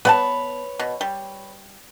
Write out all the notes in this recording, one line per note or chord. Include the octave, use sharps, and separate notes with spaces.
B3 B4 C#5 F#5 A5
B2
G3